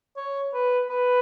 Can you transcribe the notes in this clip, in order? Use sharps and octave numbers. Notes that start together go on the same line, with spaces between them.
C#5
B4
B4